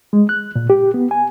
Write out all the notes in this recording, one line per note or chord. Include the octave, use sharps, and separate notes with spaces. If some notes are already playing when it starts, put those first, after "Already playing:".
G#3
F#6
A#2
G4
B3
G#5